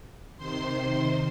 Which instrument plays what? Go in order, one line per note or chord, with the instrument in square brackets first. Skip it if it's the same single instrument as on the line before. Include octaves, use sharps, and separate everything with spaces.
[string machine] C3 D#3 C5 C6